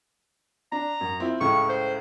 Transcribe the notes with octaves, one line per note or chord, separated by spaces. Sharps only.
D4 A#5
F#2
C4 E4 F4
C#2 A2 C#3 C#6
C5